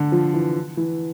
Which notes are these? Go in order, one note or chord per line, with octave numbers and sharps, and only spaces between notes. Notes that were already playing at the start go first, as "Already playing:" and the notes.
Already playing: D3
F3
E3
E3